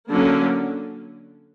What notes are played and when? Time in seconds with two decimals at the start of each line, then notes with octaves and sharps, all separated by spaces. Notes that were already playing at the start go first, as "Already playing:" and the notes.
0.11 D3 F#3 A#3 C#4